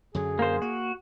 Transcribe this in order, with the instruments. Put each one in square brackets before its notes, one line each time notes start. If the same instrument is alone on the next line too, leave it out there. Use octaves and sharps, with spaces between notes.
[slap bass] F#2 D3 F#3 [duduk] G#4
[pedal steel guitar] A#3 C5
[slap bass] A#3 [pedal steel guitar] F#4